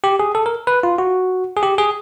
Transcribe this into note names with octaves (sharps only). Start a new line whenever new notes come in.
G4
G#4
A4
A#4
B4
F4
F#4
G#4
G4
G#4